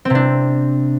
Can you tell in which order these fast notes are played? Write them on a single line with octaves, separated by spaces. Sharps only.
C4 C3 D4